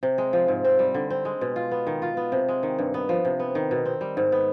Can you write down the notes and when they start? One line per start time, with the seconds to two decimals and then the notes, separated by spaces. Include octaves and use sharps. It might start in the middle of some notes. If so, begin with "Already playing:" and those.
0.03 C3
0.18 G#3
0.33 F3
0.48 G#2
0.64 C4
0.79 G3
0.94 D3
1.10 C4
1.25 G#3
1.41 B2
1.56 F4
1.71 B3
1.87 D#3
2.02 F4
2.17 B3
2.32 C3
2.48 G#3
2.63 D#3
2.79 G2
2.94 B3
3.09 F3
3.25 C3
3.40 B3
3.55 D#3
3.71 B2
3.85 C4
4.01 G3
4.17 G#2
4.32 B3